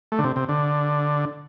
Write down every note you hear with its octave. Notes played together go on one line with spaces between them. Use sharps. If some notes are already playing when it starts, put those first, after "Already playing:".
A3
D3
C3
C3
D3